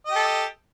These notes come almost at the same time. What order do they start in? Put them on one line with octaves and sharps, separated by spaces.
D#5 G4 A4